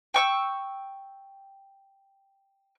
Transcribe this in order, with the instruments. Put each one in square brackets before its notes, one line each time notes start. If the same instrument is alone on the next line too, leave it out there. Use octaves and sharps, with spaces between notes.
[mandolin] G5 C#6 E6